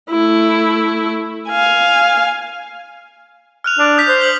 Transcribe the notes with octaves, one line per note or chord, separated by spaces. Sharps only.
A3 E4
F5 G#5
F6 F#6 F7
D4
D#6 G6 B6
C5
F6 F#7 G7